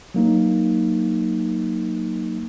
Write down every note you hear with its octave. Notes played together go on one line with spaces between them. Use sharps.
F#3 A#3 D#4